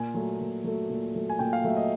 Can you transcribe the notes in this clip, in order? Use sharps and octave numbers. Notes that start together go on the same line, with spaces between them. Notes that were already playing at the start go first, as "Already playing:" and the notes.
Already playing: A#2 G#5
F#3 A3
A#2
F#3 A3
A#2
F#3 A3
G#5
A#2 G5
F5
F#3 A3 E5
D#5